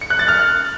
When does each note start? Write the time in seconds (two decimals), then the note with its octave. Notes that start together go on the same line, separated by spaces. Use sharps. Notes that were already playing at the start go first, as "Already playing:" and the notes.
0.01 C#7
0.10 F#6
0.19 A6
0.28 F6